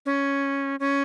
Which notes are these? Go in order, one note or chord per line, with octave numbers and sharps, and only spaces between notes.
C#4
C#4